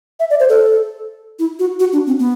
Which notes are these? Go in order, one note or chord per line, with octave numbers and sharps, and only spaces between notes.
E5
D5
C5
A4
E4
F#4
F#4
D4
C4
B3